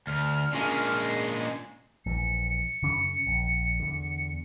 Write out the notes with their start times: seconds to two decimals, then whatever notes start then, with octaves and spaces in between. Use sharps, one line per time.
0.07 D2 F6
0.52 A#2 G#3 A#3 C#4 D4
2.06 A#1 E3 C#7
2.82 F#2 C#3 C#4
3.26 A#1
3.80 E2 D3